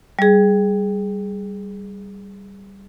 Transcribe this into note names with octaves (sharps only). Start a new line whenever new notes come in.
G3 G#4